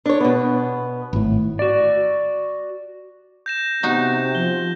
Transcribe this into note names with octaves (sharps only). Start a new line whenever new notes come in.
D4 C#5
B2 B3
G#1 A2
F#4 D5
G6 A#6 E7
C3 B3 D#4 F#4
F3 G7